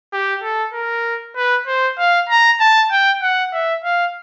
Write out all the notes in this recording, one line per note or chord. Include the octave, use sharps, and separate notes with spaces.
G4
A4
A#4
B4
C5
F5
A#5
A5
G5
F#5
E5
F5